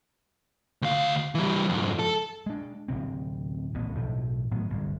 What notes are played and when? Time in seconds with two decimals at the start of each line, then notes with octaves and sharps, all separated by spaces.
0.82 D2 F5
1.35 E3 G3
1.69 F2 G#2
1.99 A4
2.46 G#3 D4
2.88 D1 C2 C3 C4
3.75 D#1 A1 B3
3.95 B1 A2 F3
4.51 G#1 A2 F#3 B3
4.70 G1 C2